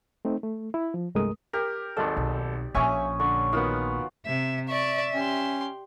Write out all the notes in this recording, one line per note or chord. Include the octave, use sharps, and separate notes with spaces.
A3 C4 D#4
A3
E4
F3
C2 G2 G#3 A3 A#4 D#6
G4 A#4
G#1 D#2 D#4 A4 D5
B1
A#1 A#2 C#4 C#5 E5 G#5 C#6 D#6
D3 C#6
D#3 B3 F4 F#4 F#5
C3 E5
D5 E5 C#6
C#4 G4 C6